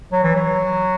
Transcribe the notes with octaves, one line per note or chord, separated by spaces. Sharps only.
F#3
E3
F#3